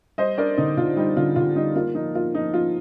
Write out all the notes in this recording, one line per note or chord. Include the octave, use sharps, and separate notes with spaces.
G3 C5 D#5
D4 A#4 D5
D3 D#4
D3 F4
G3 D#4
D3 F4
D3 F4
G3 D#4
A#3 F4
F3 D#4
A#3 F4
F3 D#4
F3 F4